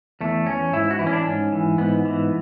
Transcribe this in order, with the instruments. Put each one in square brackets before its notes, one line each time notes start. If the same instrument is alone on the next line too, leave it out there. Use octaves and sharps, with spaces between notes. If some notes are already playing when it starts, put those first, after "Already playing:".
[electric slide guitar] E2 A3
E2 C#4
G#2 E4
F#4
E3 E4
C#4
D4
G#2 C#4
E3
G#2 B3
E3